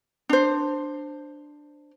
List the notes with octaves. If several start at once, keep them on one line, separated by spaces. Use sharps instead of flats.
D4 C5